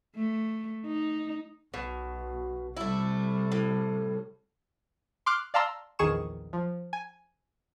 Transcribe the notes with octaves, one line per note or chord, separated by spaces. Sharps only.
A3
D#4
B1 B2
C3 G3 A3 E4
A2
C6 D6 F6 F#6
D5 F5 A5 A#5 C6 E6
A#1 E2 D#3 G#4 C#6 E7
F3
G#5